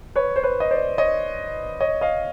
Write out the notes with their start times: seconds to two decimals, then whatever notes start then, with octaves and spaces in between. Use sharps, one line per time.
0.16 B4 C#5
0.36 C5
0.44 B4 C#5
0.60 D#5
0.71 C5 D5
0.98 C#5 D#5
1.81 C#5 D#5
2.01 D#5 F5